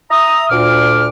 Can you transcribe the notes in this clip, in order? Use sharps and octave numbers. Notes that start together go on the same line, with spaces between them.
E5 A#5 D#6
D2 A#2 D6 F6